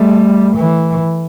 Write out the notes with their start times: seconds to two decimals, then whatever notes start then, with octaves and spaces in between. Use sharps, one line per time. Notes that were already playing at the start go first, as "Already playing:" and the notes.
Already playing: G3 A3
0.55 E3